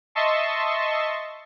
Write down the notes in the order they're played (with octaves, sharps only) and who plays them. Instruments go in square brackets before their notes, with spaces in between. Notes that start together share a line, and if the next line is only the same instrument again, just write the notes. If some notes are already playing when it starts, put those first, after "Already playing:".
[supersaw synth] D#5 E5 A5 C6 C#6